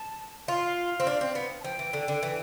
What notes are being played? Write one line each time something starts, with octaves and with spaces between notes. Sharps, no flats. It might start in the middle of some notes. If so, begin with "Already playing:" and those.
Already playing: A5
F4 F5
C4
D4
C4
B3
A5
F3 G5
E3
D3
D3
E3